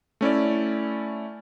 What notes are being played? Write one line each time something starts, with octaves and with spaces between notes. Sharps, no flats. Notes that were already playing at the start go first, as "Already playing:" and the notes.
A3 C#4 E4 D5